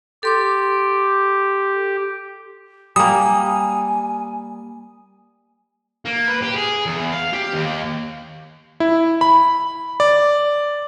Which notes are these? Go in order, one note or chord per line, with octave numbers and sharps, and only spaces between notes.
G4 A4 C6 D6
G3 A#3 G#5 D#6
A#3
B4
G4
G#4
E2
F5
G4
D#2
E4
B5
D5